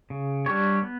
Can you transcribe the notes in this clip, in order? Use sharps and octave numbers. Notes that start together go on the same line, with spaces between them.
C#3
G3 D4 G4 C#5
B3